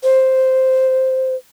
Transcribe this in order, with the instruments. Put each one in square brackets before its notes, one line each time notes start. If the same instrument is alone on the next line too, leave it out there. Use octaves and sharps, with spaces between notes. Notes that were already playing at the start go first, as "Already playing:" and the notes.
[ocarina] C5